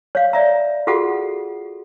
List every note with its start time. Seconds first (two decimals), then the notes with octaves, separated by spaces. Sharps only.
0.15 C#5 F5
0.33 D5 E5 A#5
0.87 F4 F#4 G#4 A4 F#5